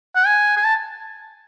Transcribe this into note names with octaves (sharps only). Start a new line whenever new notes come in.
F#5
G#5
G#5
A5